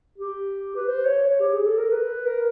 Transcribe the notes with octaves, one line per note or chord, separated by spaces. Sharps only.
G4
B4
C5
C#5
C#5
G4
G#4
A4
A#4
B4
A#4